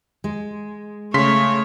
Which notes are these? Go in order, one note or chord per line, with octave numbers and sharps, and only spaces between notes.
G#3
C#3 A3 C#5 C6 B6